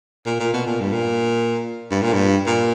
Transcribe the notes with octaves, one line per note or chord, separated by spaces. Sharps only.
A#2
A#2
B2
A#2
G2
A#2
G2
A#2
G2
A#2